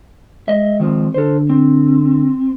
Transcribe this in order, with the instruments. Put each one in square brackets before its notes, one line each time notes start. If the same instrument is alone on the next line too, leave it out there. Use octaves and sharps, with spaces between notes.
[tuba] G#3 [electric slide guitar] D#5 E5
[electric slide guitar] D#3 F3 C4
[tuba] D3 [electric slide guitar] A4 C5
[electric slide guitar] C4